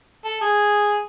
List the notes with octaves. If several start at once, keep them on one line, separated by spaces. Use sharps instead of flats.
A4
G#4